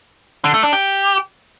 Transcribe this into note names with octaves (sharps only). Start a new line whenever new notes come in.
D3
A3
D4
G4